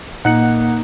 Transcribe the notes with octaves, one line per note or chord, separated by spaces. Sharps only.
A#2 A#3 D#4 F#5 F#6 C#7